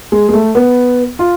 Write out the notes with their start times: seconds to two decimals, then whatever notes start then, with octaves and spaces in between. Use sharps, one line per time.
0.12 G#3
0.29 G#3
0.33 A3
0.55 B3
1.19 F4